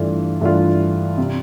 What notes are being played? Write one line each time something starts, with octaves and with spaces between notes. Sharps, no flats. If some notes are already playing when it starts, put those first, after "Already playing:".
Already playing: G2 E3 A3 D4 F4
G2 E3 A3 D4 F4
C3